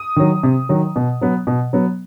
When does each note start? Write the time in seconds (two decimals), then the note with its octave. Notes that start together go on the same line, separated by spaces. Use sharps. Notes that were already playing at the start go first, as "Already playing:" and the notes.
Already playing: D#6
0.16 D#3 F#3
0.43 C3
0.69 D#3 F#3
0.96 B2
1.21 F#3 B3
1.47 B2
1.73 F#3 B3